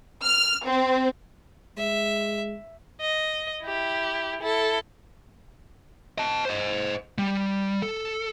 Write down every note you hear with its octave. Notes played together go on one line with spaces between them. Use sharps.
F6
C4
G#3 E5
D#5
E4 G4
E4 A4
D#5 A5
C5 D#5
G3
A4